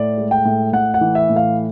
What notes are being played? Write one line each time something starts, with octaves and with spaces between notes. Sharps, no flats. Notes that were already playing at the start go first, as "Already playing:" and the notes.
Already playing: A2 D5
G#3
G5
A2
A2 F#5
F#5
E3
E5
A2
F5